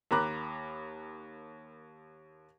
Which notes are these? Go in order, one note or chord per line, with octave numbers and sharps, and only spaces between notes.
D#2 A#4 A#5 B5 D6 F#6